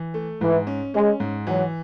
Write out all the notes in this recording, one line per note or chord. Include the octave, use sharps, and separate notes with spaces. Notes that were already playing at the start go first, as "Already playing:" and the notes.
Already playing: E3
A3
G#2 E3
C#4
G#3 C#4
G#2
E3 F#3